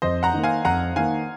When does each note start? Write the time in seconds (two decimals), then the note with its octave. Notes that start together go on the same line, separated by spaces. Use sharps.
0.02 F2 C5 D#5
0.23 F#5 A#5
0.34 D#3 A#3
0.44 F5 G#5
0.65 F2 F#5 A#5
0.96 D#3 A#3 F5 G#5